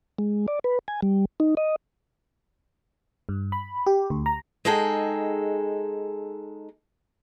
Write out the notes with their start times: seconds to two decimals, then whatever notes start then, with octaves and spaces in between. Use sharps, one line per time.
0.19 G#3
0.48 D5
0.64 B4
0.88 G#5
1.02 G3
1.40 D#4
1.57 D#5
3.29 G2
3.52 B5
3.86 G4
4.10 D2
4.26 A#5
4.65 G#3 D#4 G#4 A4 G5